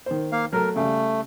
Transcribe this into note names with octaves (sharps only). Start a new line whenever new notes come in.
D#3 C5
A#3 F5
F#3 A3 A4 A#4
C#3 G3 A3